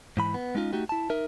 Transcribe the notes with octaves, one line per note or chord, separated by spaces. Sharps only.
G#2 E3 B5
B3
G#3 C#4 D#4 F4
A3 D#4 F#4 G4
E4 A5
D#4 A#4 E5